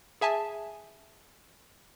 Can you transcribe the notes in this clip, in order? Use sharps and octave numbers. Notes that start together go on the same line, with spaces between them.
G#4 E5 G#5 A5